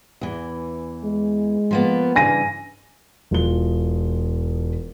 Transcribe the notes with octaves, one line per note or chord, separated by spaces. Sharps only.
E2 E3
G#3
F3 A#3 B3
G2 C#3 E3 G#5 A#6 D#7
E1 F4 G7